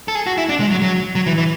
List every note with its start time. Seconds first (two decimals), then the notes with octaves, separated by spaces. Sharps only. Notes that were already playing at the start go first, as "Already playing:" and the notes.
0.08 A4
0.15 G#4
0.26 F#4
0.38 E4
0.49 D4
0.60 G#3
0.71 F#3
0.82 F#3
1.15 F#3
1.26 E3
1.38 E3